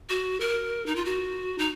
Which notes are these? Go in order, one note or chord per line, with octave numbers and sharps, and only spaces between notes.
F#4
A#4
D#4
F4
F#4
D#4